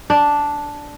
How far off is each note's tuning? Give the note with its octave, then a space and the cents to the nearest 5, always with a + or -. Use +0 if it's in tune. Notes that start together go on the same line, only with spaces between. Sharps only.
D4 -5